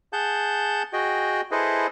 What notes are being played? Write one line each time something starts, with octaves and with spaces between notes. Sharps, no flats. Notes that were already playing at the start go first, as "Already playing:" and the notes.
G#4 F#5 A5 G6
F#4 G#4 D#5 G5
E4 G#4 A4 B4 C5 D#5